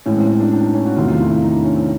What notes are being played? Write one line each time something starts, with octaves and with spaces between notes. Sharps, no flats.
A2 E3 G#3 C#4
C4
C#4
D4
D4
D#4
C#4
F#4
E2 C3 D#3 F#3 A3 F4
F4
E4
E4
D#4
D4
C#4
C4